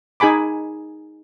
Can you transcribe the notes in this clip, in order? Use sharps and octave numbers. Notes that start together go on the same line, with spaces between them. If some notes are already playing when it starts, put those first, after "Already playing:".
D#4 G#4 G#5 B5 D6